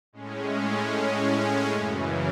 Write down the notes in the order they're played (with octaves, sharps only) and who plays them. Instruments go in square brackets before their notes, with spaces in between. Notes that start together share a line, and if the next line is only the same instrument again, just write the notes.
[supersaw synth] A2 G#3 C#4
F#2 C#3 E3